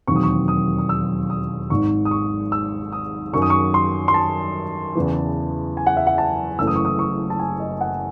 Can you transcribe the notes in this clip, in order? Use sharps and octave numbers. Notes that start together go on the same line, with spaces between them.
E1 D#2 D#3 F#3 C4 C#6
D#6
C#6
D#6
D#6
E6
D#6
G#1 G#2 D#3 G#3 C#6
D#6
C#6
E6
D#6
F#2 D#3 F#3 C#6
D#6
C#6
C6
C6
A5
E2 C#3 E3
G#5
F#5
E5
F#5
A5
F#1 F#2 E3 A3 E6
D#6
C#6
D#6
C#6
A5
G#5
D#5
F#5